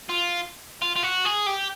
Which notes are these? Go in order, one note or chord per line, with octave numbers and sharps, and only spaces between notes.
F4
F4
F4
F#4
G#4
G4